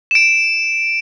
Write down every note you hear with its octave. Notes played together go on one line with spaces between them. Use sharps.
D7 E7